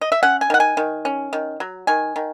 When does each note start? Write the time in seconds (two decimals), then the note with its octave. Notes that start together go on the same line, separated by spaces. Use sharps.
0.01 D#5
0.12 E5
0.23 C#4 F#5
0.41 G#5
0.50 D#3 F#5
0.60 G#5
0.77 D#3
1.05 C#4
1.33 D#3
1.60 F#3
1.87 D#3 G#5
2.16 D#3